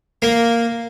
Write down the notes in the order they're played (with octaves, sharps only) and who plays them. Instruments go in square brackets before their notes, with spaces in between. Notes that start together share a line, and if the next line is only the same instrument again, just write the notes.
[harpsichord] A#3